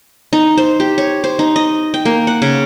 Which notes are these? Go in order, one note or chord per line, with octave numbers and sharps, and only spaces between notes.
D#4
C5
G4
C#5
C5
D#4
D#5
G5
A#3
F#5
C#3